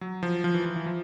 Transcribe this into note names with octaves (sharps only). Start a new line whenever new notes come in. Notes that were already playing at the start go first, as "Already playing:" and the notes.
F#3
F3
F3
E3
F3
E3
F3